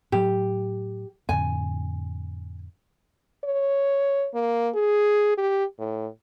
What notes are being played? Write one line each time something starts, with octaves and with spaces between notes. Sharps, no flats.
A2 F#3 G4
F2 A2 D3 G#5
C#5
A#3
G#4
G4
A2